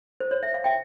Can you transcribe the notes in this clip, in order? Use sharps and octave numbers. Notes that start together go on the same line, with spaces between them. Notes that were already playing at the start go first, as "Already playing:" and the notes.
C5
C#5
E5
F5
E5 G5